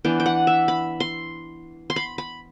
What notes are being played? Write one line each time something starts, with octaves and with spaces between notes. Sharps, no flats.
E3 B3 D4 G5
G5
F#5
E5
B5
C6
C6
B5
B5